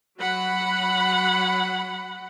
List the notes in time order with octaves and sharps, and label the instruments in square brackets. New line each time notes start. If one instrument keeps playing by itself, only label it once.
[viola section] F#3 F#5 B5